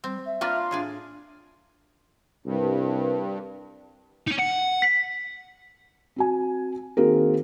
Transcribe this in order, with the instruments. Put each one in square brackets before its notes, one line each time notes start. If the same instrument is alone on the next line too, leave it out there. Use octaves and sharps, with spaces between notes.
[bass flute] G3 [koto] C4
[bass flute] E5
[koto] A#3 D4 B4 [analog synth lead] F4
[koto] A2 G#4 D5 [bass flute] D4
[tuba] C2 [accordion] G2
[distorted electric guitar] C#4 D#4
F#5
[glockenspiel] B6
[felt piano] C4 F#4 G#5
D#3 A#3 C4 F#4 G#4 A#4